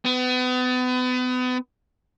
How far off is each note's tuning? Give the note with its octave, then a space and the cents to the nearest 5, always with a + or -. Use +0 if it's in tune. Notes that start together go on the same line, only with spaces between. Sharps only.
B3 +35